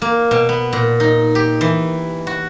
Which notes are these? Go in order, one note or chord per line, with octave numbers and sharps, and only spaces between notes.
A#3
B2
B3
A#2
D#4
G4
E3
F#4